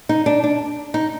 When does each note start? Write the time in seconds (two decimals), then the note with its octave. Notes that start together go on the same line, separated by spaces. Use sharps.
0.09 D#4
0.26 D4
0.44 D4
0.94 D#4